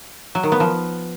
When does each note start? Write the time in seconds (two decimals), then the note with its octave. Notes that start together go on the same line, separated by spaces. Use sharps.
0.35 F#3
0.43 D#3
0.52 B3
0.60 F3